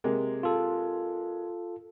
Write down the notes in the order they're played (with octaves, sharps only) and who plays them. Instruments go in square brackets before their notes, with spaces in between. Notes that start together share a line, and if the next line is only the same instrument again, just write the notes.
[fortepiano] C3 G#3 A#3
[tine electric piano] F4 A4